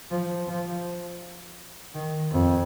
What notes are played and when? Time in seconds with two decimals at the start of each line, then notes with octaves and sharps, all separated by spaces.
0.11 F3
0.48 F3
1.94 D#3
2.32 F2